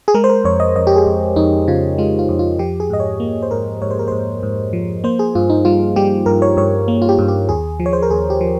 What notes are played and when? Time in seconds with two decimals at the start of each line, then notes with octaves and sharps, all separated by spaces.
0.08 G#4
0.14 G#3 A#4
0.24 C5
0.29 A#4
0.44 F2 C#5
0.60 D#5
0.76 F2 D#5
0.87 G4
0.96 G#4
1.06 F2
1.36 F2 D#4
1.68 C#3 F4
1.98 G#3 F4
2.19 F4
2.29 F2
2.39 F4
2.59 F3 G4
2.80 G#4
2.90 G#2 D#5
3.00 C#5
3.20 A#3
3.43 C5
3.51 G#2 A#4
3.82 G#2 C#5
3.91 C5
3.99 A#4
4.08 G#2 C5
4.43 G#2
4.73 F3
5.04 A#3 C5
5.19 G#4
5.35 G2 F4
5.50 D#4
5.65 G3 F4
5.96 G3 G4
6.26 G2 A#4
6.42 C#5
6.57 G2 C#5
6.88 A#3
7.02 F4
7.09 G4
7.19 G2
7.28 G4
7.49 D#2 G#4
7.80 F3
7.86 C#5
7.93 C5
8.02 A#4
8.10 D#2 G#4
8.30 G4
8.41 F3